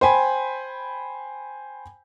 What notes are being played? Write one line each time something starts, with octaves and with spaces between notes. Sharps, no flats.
C5 G5 G#5 B5